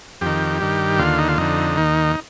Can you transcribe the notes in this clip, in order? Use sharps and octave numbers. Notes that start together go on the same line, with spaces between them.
F2 D#3 G4
G2 D#3
D#2 D3 F4
D#4
F4
F2 D3 D#4
D#2 D#3